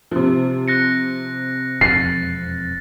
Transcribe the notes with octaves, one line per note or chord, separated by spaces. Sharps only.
C3 F3
F#6 A#6 C#7
E1 F2 A6 C7